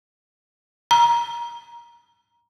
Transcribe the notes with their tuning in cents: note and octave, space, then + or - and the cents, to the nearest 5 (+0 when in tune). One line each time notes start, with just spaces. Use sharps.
A#5 +20